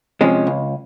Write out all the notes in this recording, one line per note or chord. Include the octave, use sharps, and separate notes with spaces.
C3 F3 G#3 C#4
C#2